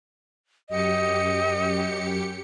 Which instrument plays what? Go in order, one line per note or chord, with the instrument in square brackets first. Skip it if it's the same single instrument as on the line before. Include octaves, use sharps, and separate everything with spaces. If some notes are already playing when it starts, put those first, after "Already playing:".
[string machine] F#2 G4 C#7 [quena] D#5